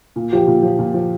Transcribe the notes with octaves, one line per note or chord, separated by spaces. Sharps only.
A#2
F3 G4
A#2
F3
A#2
F3